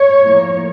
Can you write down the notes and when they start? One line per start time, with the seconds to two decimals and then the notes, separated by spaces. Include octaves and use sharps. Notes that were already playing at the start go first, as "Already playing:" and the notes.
Already playing: C#5
0.22 A2 F3 A#3